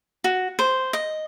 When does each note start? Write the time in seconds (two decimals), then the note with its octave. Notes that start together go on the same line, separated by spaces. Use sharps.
0.24 F#4
0.59 C5
0.93 D#5